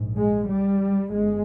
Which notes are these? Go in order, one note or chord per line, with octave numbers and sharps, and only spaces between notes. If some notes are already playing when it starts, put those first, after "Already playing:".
Already playing: A#1 G#2
G#3
G3
G1 G2 G#3